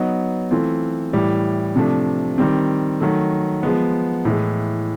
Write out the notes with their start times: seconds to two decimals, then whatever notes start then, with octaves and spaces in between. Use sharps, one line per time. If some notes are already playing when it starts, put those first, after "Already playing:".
Already playing: F#3 B3 D#4
0.51 E3 A3 C4 F4
1.13 A2 E3 G3
1.76 C3 F3 A3 D4
2.38 D#3 G3 C4
3.00 D#3 F#3 A3
3.63 F3 G#3 B3
4.25 A2 E3 G#3